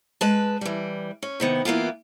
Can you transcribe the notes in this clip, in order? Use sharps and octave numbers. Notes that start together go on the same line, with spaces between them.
G#3 B4 A5
E3 G3
C#4
C3 D#3 B3
E3 A#3 B3 F4